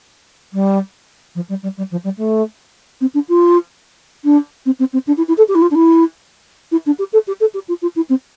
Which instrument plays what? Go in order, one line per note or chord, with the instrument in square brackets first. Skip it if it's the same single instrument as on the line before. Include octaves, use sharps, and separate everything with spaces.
[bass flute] G3
F3
G3
G3
G3
F3
G3
A3
C4
D4
F4
D4
C4
C4
C4
D4
E4
E4
A4
G4
E4
F4
D4
E4
E4
D4
G4
A4
G4
A4
G4
F4
F4
E4
C4